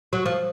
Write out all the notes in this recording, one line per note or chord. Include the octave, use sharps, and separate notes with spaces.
F#3
F3